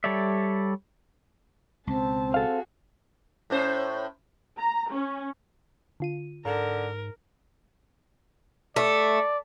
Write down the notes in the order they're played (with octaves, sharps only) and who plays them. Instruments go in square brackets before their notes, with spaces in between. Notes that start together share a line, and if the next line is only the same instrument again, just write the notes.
[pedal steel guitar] G3 A4 C#5 D5 E5
[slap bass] C#2 B2 [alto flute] C4 [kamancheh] A5
[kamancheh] F#4 G#4 [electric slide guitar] A4 F5
[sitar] A2 C#4 C5
[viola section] A#5
C#4
[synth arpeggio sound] D3 F4 D#7
[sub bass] G#2 [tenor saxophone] D3 [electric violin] A#4 [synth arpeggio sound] A#5
[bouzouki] A3 [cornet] D5